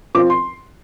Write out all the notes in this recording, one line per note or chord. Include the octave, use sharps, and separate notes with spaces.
F3 C4 F4 D6
C6